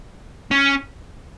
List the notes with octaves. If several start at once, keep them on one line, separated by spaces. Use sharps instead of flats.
C#4